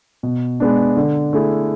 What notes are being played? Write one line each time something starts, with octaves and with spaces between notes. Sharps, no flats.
B2
G#3 B3 D4
D3
A3 E4 G#4